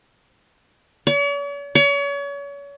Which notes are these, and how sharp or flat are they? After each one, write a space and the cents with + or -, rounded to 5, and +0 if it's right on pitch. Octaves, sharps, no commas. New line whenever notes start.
C#5 +45
C#5 +35